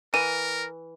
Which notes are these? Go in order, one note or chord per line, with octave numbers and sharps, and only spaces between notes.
E3 A#4 D#7